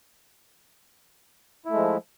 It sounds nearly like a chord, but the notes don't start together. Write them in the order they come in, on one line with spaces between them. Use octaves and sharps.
E4 A3 G#3 F3